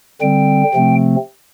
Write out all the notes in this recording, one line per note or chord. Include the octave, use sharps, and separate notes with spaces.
D3 G3 C4 G5
C3 F3 A3 C4